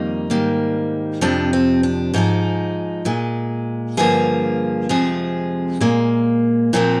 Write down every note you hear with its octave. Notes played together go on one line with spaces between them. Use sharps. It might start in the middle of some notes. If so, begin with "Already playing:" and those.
Already playing: F2 D#3 G3 A#3 D#4
G#2 D#3 G3 A#3
F2 C3 F3 D4
C4
D4
G#2 F3 G#3 D#4
A#2 G#3
G2 D3 F3 A#3 G#4
F2 C3 F3 G#3 G#4
A#2 G#3 A#3
A#2 F3 A#3 C4